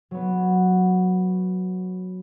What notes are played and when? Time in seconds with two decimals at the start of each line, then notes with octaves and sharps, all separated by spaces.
0.11 F#3 B3